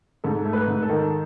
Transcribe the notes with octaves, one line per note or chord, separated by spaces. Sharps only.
G#2 A4
A3
B4
G#2
A4
D#3